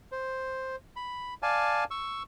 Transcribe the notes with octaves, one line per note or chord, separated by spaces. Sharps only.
C5
B5
D5 F5 G#5 A5
C#6 E6